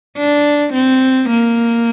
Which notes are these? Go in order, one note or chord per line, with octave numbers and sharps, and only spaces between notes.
D4
C4
A#3